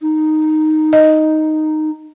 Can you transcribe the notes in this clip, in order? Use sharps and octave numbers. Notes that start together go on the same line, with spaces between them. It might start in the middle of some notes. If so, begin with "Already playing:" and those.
D#4
D#5